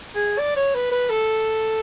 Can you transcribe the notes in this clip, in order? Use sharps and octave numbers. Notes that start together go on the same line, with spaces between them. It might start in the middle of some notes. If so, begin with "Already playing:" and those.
G#4
D5
C#5
B4
B4
A4